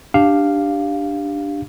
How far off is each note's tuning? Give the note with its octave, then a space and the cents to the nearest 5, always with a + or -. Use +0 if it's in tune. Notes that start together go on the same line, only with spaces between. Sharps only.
D4 +0 G4 +0 F5 +0